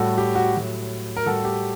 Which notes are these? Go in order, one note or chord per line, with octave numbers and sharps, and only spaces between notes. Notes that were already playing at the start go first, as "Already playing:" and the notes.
Already playing: A2 G3 F#4 A4
G4
F#4
A2 F#3
A#4
A2 G3 F#4 A4
G4